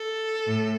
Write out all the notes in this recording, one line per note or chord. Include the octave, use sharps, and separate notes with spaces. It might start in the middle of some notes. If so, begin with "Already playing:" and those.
Already playing: A4
A2